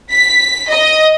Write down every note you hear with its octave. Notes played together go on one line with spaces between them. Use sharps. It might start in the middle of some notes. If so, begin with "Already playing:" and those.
B6
D#5